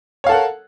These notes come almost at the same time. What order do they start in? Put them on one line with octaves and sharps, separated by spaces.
C#5 F5 A4 F#5 A#4